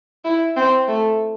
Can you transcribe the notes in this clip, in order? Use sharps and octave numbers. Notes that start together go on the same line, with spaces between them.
E4
C4
A3